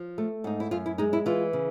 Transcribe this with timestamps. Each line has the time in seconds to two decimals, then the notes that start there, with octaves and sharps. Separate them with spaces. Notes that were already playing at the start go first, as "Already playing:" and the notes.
Already playing: F3
0.18 A3
0.44 G#2 D#4
0.60 E4
0.71 F#2 F4
0.86 E4
0.98 G#3 D#4
1.13 E4
1.26 E3 F4
1.53 C#3